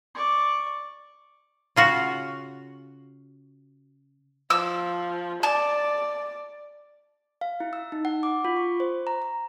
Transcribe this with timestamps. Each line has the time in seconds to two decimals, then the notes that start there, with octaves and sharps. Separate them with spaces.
0.14 D5 C#6
1.76 C#3 F4 F#4
4.50 F3 E6
5.43 D5 A5
7.41 F5
7.60 E4
7.73 E6
7.92 D#4
8.05 F#5
8.23 D6
8.45 F4
8.56 C#6
8.80 C5
9.07 A#5
9.22 A#5